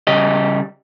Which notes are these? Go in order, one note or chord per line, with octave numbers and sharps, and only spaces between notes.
C#3 G3 G4 D#5